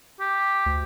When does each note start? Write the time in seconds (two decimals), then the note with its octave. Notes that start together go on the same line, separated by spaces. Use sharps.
0.20 G4
0.66 D2